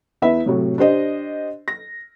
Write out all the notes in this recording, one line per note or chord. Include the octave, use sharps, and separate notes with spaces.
E2 E4 B4 E5
A2 C3 F#3
D4 G4 C5 D#5
A#6